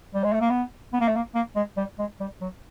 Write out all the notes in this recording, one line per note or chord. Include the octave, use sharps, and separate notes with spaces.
G3
G#3
A3
A#3
B3
B3
A#3
A3
A#3
A#3
G#3
G3
G#3
G3
F#3